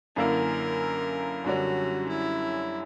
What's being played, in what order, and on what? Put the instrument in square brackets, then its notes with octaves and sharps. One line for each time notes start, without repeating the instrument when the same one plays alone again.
[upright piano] F#2 D3 A#3 E4 [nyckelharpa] A#4
[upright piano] F#2 D3 G3 C#4 [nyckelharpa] F#4
[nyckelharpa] E4